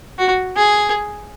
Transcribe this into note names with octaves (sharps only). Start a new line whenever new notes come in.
F#4
G#4